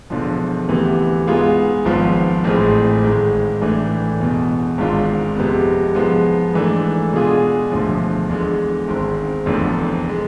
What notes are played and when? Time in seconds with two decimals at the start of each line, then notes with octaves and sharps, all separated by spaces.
0.10 E1 E2 D3 F3
0.68 D2 C3 E3 B3
1.27 G#2 G#3 B3 F4 G#4
1.85 G#1 G#2 F3 B3 F4
2.44 A1 A2 G#3 C4 G#4
3.03 G#1 G#2 G#3
3.61 A2 E3 A3 D4
4.19 E1 E2 B2
4.78 G#1 G#2 G#3 D4 F4
5.36 F2 C3 G#3 B3
5.95 G#2 F3 G#3 B3
6.54 G#2 E3 A3 D4
7.13 B2 G#3 D4 F4 G#4
7.72 E1 D2 D3 F3
8.30 E2 D3 G#3
8.88 G#1 G#2 G#3 C4
9.46 F1 E2 D3 F3
10.09 G#3